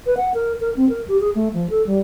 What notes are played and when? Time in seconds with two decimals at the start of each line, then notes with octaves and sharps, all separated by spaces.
0.06 B4
0.17 F#5
0.34 A#4
0.60 A#4
0.77 C4
0.89 A#4
1.08 G4
1.21 G#4
1.35 A3
1.53 F3
1.70 A4
1.87 G3